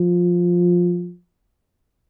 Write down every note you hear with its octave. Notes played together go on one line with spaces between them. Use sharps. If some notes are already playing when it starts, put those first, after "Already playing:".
Already playing: F3